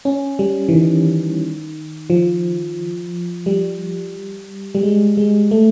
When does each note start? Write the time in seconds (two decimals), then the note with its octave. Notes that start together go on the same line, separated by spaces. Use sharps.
0.05 C#4
0.39 G3
0.69 E3
0.73 D#3
2.10 F3
3.46 G3
4.75 G3
4.83 G#3
5.17 G#3
5.51 A3